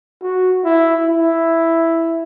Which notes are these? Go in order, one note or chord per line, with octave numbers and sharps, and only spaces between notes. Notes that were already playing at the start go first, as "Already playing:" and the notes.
F#4
E4
E4